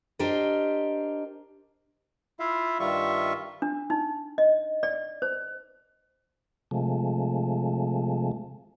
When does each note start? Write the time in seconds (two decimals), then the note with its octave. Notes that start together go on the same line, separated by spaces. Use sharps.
0.19 D4 G4 A#4 C5 D#5
2.40 E4 F4 E5 F5
2.80 G2 D#3 G3 F4 E5 C#6
3.62 D4
3.90 D#4
4.38 D#5
4.83 D5
5.22 C5
6.71 C3 F3 G#3 A3